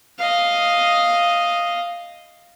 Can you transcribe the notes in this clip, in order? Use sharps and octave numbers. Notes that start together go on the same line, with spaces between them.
D#5 F5